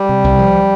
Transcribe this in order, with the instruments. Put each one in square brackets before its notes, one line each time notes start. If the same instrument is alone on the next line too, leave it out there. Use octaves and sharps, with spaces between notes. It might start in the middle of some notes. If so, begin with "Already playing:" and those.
Already playing: [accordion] G3
[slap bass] C3
C2
F3